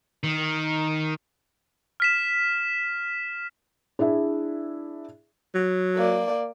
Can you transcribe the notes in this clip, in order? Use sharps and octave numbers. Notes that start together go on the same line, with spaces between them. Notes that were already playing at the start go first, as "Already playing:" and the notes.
D#3
F6 B6 E7
D4 E4 G#4 E5
F#3
A#3 D5